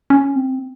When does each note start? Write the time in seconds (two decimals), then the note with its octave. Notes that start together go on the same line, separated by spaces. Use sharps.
0.10 C#4
0.36 C4